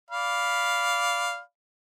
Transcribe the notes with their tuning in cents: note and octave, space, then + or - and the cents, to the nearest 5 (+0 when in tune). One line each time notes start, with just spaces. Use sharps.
D5 -15 F5 +0 B5 +0